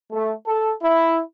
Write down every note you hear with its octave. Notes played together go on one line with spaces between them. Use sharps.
A3
A4
E4